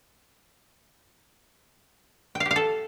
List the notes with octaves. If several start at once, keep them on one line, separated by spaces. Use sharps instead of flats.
G5
F5
G4
F5
A4